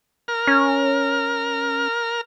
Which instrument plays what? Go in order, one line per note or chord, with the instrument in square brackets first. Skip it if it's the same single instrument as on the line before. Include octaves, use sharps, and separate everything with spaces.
[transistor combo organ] A#4 F6
[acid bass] C#4